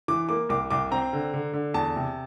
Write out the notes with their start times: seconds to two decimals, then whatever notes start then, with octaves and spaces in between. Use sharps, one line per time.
0.08 E3 D6
0.29 A#3 D6
0.49 C2 D6
0.70 C2 D6
0.91 C4 A#5
1.13 D3
1.34 D3
1.53 D3
1.74 E2 A5
1.96 C3